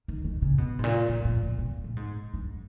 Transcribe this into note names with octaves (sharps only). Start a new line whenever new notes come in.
D#3
D#3
C#3
B2
G#2
A#2
A#2
A#2
A#2
B2
A#2
G#2
G2